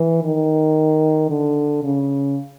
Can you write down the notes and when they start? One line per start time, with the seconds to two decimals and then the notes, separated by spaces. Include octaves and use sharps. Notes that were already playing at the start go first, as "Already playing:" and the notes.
Already playing: E3
0.23 D#3
1.30 D3
1.83 C#3